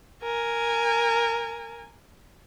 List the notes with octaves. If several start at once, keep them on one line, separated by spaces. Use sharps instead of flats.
A#4 G#5